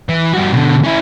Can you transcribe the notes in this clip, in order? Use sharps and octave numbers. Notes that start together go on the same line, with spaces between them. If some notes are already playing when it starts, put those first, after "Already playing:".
E3
G2 F#4
B2 D3
C#4 E4